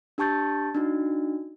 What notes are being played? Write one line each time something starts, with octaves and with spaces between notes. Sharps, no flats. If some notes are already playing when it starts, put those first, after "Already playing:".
D4 G4 A5 C#6 G6 A6
D4 D#4 F#4